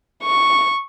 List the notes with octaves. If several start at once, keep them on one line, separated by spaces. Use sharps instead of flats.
C#6